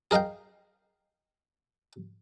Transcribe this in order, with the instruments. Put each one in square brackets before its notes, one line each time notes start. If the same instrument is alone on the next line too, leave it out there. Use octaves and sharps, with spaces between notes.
[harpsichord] G#4 A#4 D#5 F5 G5